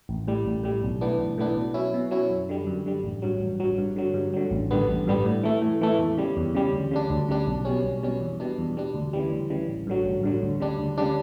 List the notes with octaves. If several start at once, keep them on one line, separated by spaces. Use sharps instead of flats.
A1
A2 G3
A1
A2 G3
B1
A2 E3 B3 D4
B1
A2 E3 B3 D4
B2
F#3 C#4 E4
B2
F#3 C#4 E4
F#2
D3 G3
F#2
D3 G3
A1
G2 F#3
A1
G2 F#3
G2
D3 F#3
G2
D3 F#3
A1
G2 D3 G3 B3
A1
G2 D3 G3 B3
A2
E3 A3
A2
E3 A3
E2
C#3 G3
E2
C#3 G3
D2
C#3 G3 D4
D2
C#3 G3 D4
B1
B2 G3 C#4
B1
B2 G3 C#4
E2
B2 G3 D4
E2
B2 G3 D4
D2
C#3 E3 G3
D2
C#3 E3 G3
A1
G2 D3 F#3
A1
G2 D3 F#3
D2
C#3 G3 D4
D2
C#3 G3 D4